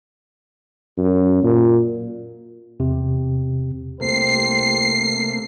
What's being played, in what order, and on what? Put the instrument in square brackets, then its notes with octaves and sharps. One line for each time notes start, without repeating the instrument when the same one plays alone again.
[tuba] F#2
A#2
[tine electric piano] E2 C3
[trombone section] C2 G4 C5 [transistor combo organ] C3 A3 A#3 [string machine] C7